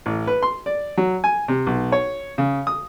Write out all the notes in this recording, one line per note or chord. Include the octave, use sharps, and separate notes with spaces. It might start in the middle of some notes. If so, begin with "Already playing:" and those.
A1
B4
C6
D5
F#3
G#5
C3
B1
C#5
C#3
D#6